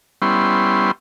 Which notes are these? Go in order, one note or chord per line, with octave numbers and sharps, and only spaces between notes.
G3 B3 C#4 E4 C6